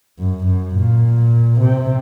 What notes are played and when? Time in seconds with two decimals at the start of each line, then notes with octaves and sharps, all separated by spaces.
0.19 F#2
0.47 F#2
0.75 A#2
1.60 C3